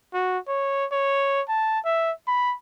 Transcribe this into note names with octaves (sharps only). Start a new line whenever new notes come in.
F#4
C#5
C#5
A5
E5
B5